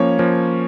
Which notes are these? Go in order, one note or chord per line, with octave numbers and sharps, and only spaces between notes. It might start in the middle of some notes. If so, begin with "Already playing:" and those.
Already playing: F3 A#3 C#4 C#5
F3 A#3 C#4